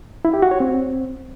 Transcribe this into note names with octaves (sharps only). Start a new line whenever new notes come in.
E4
G4
F#4
C#5
C4